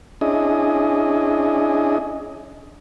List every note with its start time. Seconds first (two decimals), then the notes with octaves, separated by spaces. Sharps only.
0.21 C#4 D4 E4 G#4 D#5